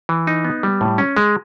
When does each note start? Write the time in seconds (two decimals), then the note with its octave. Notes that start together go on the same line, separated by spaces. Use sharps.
0.09 E3
0.27 D#4
0.45 B3
0.63 G3
0.81 A2
0.98 C#4
1.17 G#3